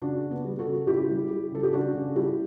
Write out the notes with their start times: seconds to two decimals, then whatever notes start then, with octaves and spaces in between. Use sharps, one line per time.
0.02 C#3 D4 F#4
0.23 C#3
0.31 B3
0.45 G3
0.59 F#4 A4
0.67 C#3
0.87 C#3 E4 G4
1.09 G3
1.31 G3
1.52 C#3 A4
1.63 G4
1.73 C#3 D4 F#4
1.95 C#3
2.15 G3 E4 G4